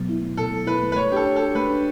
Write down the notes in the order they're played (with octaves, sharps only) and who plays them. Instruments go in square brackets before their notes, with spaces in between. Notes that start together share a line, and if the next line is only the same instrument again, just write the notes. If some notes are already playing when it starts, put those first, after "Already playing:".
Already playing: [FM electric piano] B2 F#3 B3
E4
A3
[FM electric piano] B2 [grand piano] A4
[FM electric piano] F#3
[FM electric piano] E4 [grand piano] B4
[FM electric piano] A3
[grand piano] B4
[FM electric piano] A3 [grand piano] C#5
[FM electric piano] D4 [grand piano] G4 A4
[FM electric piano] C#5
[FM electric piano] F#4 [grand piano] A4
[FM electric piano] A3 [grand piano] B4
[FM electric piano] D4